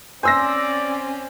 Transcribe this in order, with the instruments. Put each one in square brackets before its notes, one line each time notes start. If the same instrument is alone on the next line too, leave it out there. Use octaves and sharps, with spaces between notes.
[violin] C4 C#4 [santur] C5 [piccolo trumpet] D5 [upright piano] G#5 E6 A#6